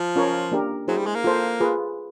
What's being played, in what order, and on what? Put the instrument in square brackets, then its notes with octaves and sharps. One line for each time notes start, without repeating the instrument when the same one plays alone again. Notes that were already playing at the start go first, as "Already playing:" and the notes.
Already playing: [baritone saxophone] F3
[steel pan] C#4 F4 A#4 C#5
A#3 D4 G4 A#4
[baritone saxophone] F#3 [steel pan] E4 G#4 C5
[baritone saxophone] G3
G#3
A#3
[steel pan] F4 A4 C5
F4 G#4 B4